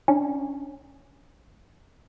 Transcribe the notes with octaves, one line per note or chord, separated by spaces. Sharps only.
C#4 D4